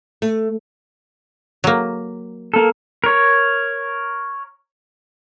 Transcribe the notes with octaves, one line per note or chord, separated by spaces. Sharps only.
A3
F#3 A#3
A#3 A4
A#4 C#5